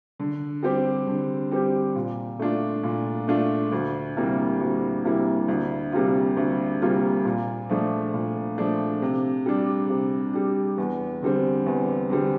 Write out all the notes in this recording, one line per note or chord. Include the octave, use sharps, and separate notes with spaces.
D3
G3 C4 G4
D3
G3 C4 G4
A#2
A3 D4 F4
A#2
A3 D4 F4
D2
C3 G3 A#3 E4
D2
C3 G3 A#3 E4
D2
C3 G3 A#3 F4
D2
C3 G3 A#3 F4
A#2
F3 A3 D4
A#2
F3 A3 D4
C3
G3 D4
C3
G3 D4
E2
D3 G3 C4
E2
D3 G3 C4